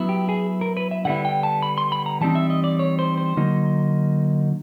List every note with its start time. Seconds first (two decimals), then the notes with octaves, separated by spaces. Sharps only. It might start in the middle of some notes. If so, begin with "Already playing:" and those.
Already playing: F#3 B3 E4
0.09 G4
0.29 G#4
0.61 A#4
0.77 B4
0.91 E5
1.05 D3 G3 B3 E4 F#5
1.25 G5
1.43 A5
1.63 B5
1.78 C6
1.92 B5
2.06 A#5
2.21 E3 G3 C4 D#4 A5
2.35 E5
2.50 D#5
2.64 D5
2.79 C#5
2.99 C5
3.18 C5
3.37 D3 F#3 A#3 D#4